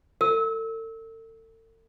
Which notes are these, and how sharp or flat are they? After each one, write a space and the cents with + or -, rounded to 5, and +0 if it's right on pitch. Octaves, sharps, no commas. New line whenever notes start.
A4 +40 E6 -30